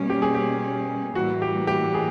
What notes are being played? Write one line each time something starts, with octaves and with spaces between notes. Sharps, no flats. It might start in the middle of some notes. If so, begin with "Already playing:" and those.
Already playing: B2 G3 A#3 C#4
G4
G#4
G4
A2 E3 G3 A#3 F#4
G4
G4
G#4